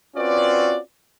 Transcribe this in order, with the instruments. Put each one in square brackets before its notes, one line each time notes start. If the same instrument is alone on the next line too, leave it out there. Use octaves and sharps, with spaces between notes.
[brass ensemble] C4 C#4 F4 F#4 B4 D5